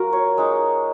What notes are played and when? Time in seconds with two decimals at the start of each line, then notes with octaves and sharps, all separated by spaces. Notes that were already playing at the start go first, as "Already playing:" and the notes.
Already playing: F#3 F4 F#4 A#4
0.13 C#5
0.38 G#3 D#4